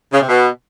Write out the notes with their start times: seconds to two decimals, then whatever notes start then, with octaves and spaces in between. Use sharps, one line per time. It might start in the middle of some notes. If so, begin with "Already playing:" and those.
0.13 C#3
0.21 C3
0.29 B2